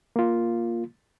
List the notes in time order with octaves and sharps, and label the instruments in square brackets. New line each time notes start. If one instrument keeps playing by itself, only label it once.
[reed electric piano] A#3 F4